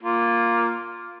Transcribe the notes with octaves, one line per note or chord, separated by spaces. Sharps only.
A#3 F4